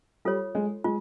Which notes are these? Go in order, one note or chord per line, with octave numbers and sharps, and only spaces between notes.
G3 F4 A4 C#5
G#3
G#3 F4